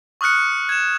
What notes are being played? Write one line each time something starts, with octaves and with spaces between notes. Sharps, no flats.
C#6 D#6 F6 F#6 C#7
G#6 E7